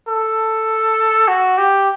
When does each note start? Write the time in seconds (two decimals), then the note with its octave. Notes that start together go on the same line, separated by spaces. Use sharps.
0.09 A4
1.28 F#4
1.58 G4